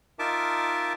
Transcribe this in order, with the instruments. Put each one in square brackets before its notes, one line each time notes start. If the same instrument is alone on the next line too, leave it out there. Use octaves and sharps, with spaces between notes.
[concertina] D#4 F4 A#4 E5 A5 D6